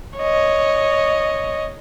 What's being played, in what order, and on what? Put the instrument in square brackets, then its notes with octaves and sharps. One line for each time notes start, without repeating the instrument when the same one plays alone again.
[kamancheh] C#5 D#5